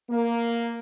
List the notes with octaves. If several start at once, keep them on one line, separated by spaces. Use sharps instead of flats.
A#3